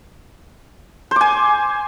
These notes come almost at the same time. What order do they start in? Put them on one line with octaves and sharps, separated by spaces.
C5 D6 G#5